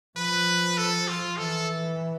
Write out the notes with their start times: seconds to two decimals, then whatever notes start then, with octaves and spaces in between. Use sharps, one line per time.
0.17 F3 B4
0.78 A4
1.08 F4
1.38 E3 A4